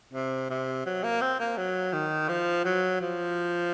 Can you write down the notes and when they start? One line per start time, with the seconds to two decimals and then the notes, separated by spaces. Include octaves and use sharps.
0.14 C3
0.50 C3
0.86 F#3
1.04 A#3
1.21 C4
1.40 A#3
1.58 F#3
1.93 D#3
2.29 F3
2.65 F#3
3.01 F3